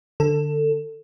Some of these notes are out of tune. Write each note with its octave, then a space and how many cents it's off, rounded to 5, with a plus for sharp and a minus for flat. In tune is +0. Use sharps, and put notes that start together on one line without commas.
D3 +10 A4 +20